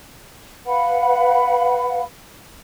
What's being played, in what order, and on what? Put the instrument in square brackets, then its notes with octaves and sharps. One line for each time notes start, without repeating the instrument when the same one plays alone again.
[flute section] B4 F5 F#5 B5